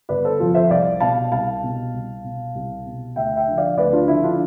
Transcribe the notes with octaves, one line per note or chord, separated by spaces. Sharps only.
G1 B4 D5
A4 C5
F2 C3 F3 F4 A4
C5 E5
C2 D5 F5
B2 F5 A5
C2 F5 A5
B2
C2
B2
C2
B2
D2 E5 G5
E5 G5
D3 F3
D5 F5
D2 B4 D5
D4 F4
D3 F3 E4
D4 F4